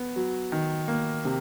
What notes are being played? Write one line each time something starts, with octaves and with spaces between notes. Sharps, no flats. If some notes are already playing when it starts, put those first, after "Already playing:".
Already playing: B3
F#3
D#3
A#3
C3